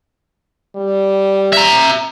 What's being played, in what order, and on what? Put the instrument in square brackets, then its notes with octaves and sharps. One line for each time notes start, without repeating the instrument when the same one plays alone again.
[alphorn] G3
[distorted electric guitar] E5 A#5